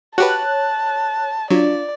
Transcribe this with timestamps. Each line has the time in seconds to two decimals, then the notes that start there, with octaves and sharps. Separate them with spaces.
0.18 F#4 G4 B4 C#5 A5 F#6
1.51 F#3 D4 F4 D5